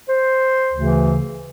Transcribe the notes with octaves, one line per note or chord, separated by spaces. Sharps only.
C5
D2 C#3 E3